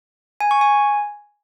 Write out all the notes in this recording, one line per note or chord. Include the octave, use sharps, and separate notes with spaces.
G#5
C#6
G#5